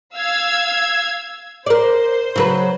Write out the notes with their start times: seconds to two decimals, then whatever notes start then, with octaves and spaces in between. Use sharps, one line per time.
0.16 F5 E6 G#6
1.66 A#4 C5 D5
2.36 C#3 F#3 B4